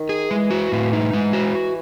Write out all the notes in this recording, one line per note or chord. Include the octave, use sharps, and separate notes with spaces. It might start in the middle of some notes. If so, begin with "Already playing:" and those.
Already playing: D#3
G#4
E3 G#3
F#4
A2
D#4
G#3
F#4